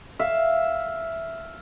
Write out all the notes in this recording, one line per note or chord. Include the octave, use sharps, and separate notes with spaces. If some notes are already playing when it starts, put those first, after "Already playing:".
E5 F5